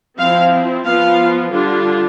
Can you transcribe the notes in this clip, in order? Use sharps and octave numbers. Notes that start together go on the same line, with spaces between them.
F3 C4 E4 F5
F3 B3 F4 F5
D3 G3 D4 F4